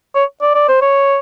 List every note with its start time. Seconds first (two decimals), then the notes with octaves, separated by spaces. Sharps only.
0.15 C#5
0.42 D5
0.55 D5
0.69 C5
0.82 C#5